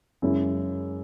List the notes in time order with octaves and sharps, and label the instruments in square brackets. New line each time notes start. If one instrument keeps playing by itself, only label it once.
[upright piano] F#2 C#3 G#3 C#4 E4